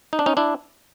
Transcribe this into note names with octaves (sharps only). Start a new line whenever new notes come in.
D#4
D4
C#4 D#4
D4 E4